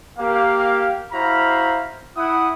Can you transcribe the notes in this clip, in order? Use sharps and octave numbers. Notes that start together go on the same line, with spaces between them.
A#3 G4 F5
E4 F#4 C5 F5 A#5 B5
E4 F#5 D#6